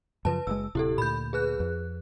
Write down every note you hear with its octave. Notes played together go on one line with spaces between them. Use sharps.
F#2 C#3 F3 B4 A5
F#1 G#3 E6
D1 C3 E4 G4 A4
D2 A#2 B5 G6
G#4 B4 F#6
F2